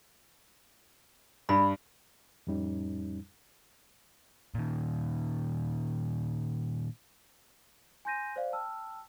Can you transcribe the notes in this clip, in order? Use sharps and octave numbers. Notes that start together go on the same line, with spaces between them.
G2 B5
F2 A2 G3 C#4 D#4
A#2 D#3
G#5 C6 G6 A#6 D#7
C5 D5 F5
G5 A5 E6 F6